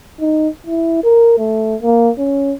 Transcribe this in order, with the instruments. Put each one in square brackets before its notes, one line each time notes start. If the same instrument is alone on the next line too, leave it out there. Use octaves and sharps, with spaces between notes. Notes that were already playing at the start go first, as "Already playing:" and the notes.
[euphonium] D#4
E4
A#4
A3
A#3
C#4